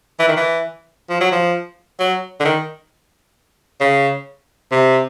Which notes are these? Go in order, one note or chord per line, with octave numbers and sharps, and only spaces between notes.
E3
D#3
E3
F3
F#3
F3
F#3
D3
D#3
C#3
C3